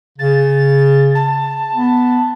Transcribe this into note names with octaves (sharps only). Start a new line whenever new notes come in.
C#3 A6
A5
B3